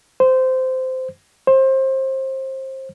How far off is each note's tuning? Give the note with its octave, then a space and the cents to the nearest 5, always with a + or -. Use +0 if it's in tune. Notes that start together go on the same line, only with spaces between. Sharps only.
C5 -15
C5 +25